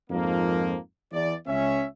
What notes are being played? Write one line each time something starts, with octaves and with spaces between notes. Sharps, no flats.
F2 G#2 F3 A#3
E2 D5
C#2 C#4 E5